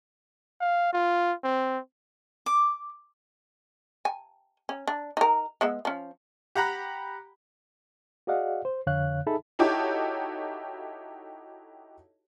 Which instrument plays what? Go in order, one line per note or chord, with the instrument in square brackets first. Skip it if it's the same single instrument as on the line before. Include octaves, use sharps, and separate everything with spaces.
[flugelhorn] F5
F4
C4
[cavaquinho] D6
[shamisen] G#5
C#4
D4
D#4 A#4
G#3 B3 E5
F3 C#4
[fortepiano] G4 F#5 A#5 B5
[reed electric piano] F#4 G#4 D5 D#5 F5 F#5
C5
F2 D3 C#5 F5 F#6
D#4 G#4 A4 E5 A5 B5
[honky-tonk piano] D#4 E4 F#4 G4 A4 C#5